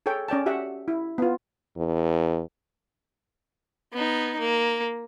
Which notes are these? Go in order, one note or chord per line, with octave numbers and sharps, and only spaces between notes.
G#4 A4 C#5 G5
C#4 D5 G5 A5
F#4 G4 E5 F#5
E4
B3 F4
E2
B3 D#4
A#3